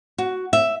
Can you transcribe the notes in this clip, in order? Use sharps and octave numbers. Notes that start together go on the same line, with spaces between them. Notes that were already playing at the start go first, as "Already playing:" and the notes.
F#4
E5